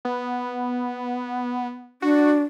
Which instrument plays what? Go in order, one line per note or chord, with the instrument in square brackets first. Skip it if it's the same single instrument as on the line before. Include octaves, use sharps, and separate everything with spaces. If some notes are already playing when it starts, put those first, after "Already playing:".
[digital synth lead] B3
[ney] D4 [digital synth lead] F#4